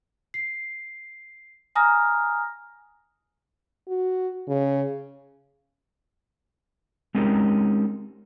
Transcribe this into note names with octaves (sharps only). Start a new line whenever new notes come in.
C7
G#5 A#5 D#6 F6 A#6
F#4
C#3
G#3 C4 C#4 D#4 G4 A#4